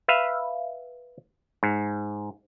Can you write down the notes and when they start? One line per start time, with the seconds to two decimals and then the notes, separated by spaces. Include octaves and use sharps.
0.08 B4 E5 F5
1.63 G#2